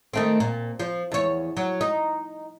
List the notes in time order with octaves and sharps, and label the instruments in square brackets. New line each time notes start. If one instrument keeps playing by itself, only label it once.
[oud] D#3 A3 C4
A#2
F3
E2 C#5
F#3
D#4